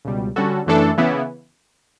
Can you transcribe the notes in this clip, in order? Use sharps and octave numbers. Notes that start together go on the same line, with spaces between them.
C#2 B2 G3
D3 G3 C#4 F#4 A4
F#2 E3 A3 D4 A4
C#3 E3 B3 E4